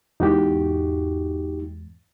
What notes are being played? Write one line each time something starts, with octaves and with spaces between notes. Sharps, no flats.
E2 G#2 D#4 F#4 G4